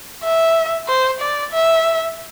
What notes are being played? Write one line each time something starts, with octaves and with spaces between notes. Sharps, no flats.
E5
C5
D5
E5